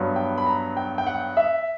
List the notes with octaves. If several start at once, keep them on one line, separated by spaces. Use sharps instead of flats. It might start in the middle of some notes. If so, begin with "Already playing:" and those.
Already playing: G2 F#3 B3
G5
B5
A#5
G5
G5
F#5
E5